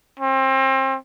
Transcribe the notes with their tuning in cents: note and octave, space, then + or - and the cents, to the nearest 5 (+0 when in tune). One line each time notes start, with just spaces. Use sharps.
C4 +30